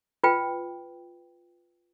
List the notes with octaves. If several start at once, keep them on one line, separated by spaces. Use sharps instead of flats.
F4 B4 G5